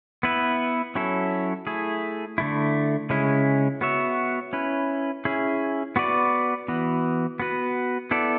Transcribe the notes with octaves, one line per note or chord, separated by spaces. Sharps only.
B3 E4 B4
F#3 C#4 E4 A4
A3 E4 G#4
D3 A3 E4
C#3 G#3 C#4 E4
B3 F#4 C#5 E5
C#4 E4 B4
C#4 E4 G#4
B3 F#4 B4 D5
E3 B3 F#4
B3 F#4 B4
B3 E4 A4 D5